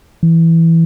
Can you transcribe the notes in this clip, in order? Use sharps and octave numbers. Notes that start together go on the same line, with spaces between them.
E3